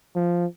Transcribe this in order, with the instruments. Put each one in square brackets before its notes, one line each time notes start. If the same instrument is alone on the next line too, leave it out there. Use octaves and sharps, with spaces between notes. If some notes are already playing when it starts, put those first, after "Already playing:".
[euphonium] F3